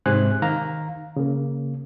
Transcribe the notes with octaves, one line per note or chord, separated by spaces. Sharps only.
G#2 C3 C5 G#5 F#6
D#3 F5 A#5
C#3 A#3